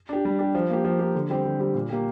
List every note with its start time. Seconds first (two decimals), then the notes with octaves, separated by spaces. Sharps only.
0.09 D4 G4
0.25 G3
0.39 D4 G4
0.55 F3
0.70 A#3 G4
0.85 F3
0.99 A#3 G4
1.15 D3
1.29 G3 C4 G4
1.45 D3
1.60 G3 C4 G4
1.74 A#2
1.90 A#3 G4